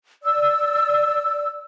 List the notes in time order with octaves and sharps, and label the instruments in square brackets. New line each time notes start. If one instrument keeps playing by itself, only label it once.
[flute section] D5 E6